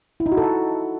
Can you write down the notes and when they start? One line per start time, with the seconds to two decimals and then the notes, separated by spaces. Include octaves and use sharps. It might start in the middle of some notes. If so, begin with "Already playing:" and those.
0.20 E4
0.26 D#4
0.32 F#4
0.37 A4
0.43 F#5